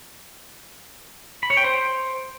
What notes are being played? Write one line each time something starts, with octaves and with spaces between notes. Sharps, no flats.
B5
C#5
G5
C5